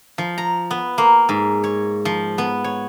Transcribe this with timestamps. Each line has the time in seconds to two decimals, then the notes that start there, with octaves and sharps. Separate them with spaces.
0.18 F3
0.38 A#5
0.71 B3
0.98 A#3
1.29 G#2
1.64 C#5
2.05 F3
2.38 B3
2.64 C#5